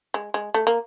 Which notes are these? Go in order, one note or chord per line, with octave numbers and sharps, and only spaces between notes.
G#3
G#3
A3
A#3